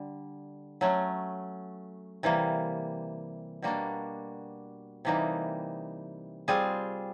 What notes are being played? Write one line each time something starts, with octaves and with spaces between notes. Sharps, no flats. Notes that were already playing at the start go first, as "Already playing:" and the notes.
Already playing: D3 G3
F#3 A3 C#4
C3 E3 G3 A#3
B2 G3 A#3 D4 F#4
C3 E3 G3 A#3 D#4
G3 C4 F4 G#4